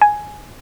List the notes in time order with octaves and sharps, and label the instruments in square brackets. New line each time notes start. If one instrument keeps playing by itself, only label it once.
[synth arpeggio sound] G#5